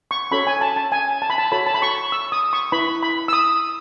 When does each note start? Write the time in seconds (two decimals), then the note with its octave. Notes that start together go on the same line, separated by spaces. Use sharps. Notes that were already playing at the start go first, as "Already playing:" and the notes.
0.11 C#6
0.31 C#4 F#4 A4 C#5 B5
0.47 G#5
0.61 A5
0.76 A5
0.92 G#5
1.22 A5
1.30 B5
1.38 A5
1.52 F#4 A4 C#5 B5
1.66 A5
1.74 B5
1.82 C#6
2.12 E6
2.32 D#6
2.53 C#6
2.72 E4 B4 B5
3.03 B5
3.28 E6
3.33 D#6